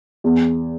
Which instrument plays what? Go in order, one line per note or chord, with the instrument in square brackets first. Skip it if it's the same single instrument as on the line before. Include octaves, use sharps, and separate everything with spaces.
[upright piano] E2